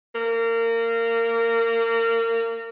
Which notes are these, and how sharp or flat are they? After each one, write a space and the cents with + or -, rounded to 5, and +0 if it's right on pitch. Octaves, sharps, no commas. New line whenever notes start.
A#3 -25